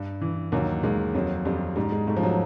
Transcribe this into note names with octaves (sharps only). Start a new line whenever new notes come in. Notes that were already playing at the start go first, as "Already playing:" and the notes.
Already playing: G2
E3
D#2 F#3
D#2 G#3
F2 F#3
F2 G3
G#2 G3
G#3
G#2 A3
F3
F#3